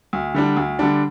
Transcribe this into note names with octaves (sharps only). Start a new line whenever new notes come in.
D2
D3 G3 D4
D2
D3 G3 D4